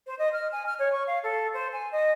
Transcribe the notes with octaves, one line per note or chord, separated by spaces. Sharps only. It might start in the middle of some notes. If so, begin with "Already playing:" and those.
C5
D#5
F6
G#5
F6
C#5
C#6
F5
A4
C5
G#5
D#5